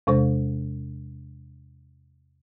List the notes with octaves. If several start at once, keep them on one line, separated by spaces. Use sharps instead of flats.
E2 C3 G#3 C5